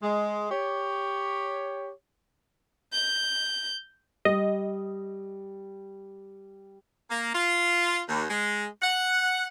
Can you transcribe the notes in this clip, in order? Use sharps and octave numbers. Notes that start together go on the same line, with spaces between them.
G#3
G4 C#5
G6
G3 D#5
A#3
F4
D#2
G#3
F#5